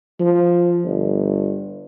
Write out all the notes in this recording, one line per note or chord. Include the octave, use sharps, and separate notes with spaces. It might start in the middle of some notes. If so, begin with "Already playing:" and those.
F3
G1